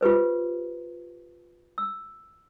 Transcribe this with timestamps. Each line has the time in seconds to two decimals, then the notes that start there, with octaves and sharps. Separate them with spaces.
0.01 F4 G4 B4 C5
1.78 E6